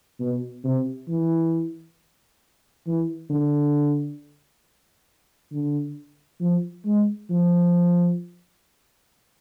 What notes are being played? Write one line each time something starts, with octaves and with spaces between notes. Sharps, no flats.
B2
C3
E3
E3
D3
D3
F3
G#3
F3